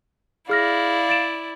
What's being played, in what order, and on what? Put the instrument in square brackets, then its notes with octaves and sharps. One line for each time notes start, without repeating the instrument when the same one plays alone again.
[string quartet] E4 D5 [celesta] G#4 F6 A#6 [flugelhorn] F5
[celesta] A6 D7 E7